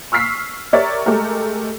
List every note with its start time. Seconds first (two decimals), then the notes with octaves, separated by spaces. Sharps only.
0.12 C#6 E6 F6 B6 C7
0.73 G4 A#4 C#5 D5 E5
1.06 G#3 A3 G4 A#4